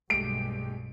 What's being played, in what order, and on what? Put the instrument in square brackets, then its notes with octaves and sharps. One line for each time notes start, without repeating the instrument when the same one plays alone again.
[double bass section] B1 G2 [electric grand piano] G#3 A3 G4 [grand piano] D7